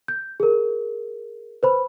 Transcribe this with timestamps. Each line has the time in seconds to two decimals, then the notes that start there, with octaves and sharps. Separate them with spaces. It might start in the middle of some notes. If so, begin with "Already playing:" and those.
0.08 G6
0.40 G#4 A#4
1.63 B4 C5 B5